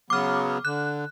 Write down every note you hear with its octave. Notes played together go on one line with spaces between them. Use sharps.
C#3 F#3 B3 D6 F6
D3 F#6